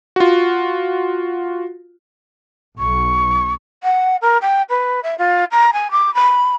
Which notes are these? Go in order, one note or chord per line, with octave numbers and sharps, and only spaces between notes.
F4 F#4
B1 C#6
F#5
A#4
G5
B4
E5
F4
A#5
G#5
D6
B5